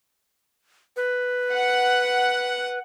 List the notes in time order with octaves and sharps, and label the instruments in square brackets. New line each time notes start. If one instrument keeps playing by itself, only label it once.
[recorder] B4
[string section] F#5